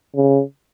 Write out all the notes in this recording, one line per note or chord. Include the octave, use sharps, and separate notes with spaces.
C#3